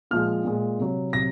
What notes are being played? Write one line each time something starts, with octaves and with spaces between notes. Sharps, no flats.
A#2 F3 G#3 F6
A#2 G#3
C3 F#3
C3 F#3 A#6